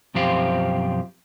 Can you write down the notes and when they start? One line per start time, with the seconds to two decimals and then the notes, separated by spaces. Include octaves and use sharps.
0.14 B1 F#2 F3 C4 G4 F5